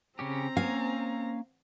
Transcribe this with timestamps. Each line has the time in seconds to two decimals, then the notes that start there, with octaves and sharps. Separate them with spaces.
0.19 C#3 C4 C#4 G4 A#5
0.57 A#3 C#4 F5 G#5